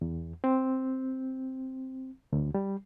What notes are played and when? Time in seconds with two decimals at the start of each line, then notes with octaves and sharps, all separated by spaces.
0.01 E2
0.44 C4
2.32 D2
2.54 G3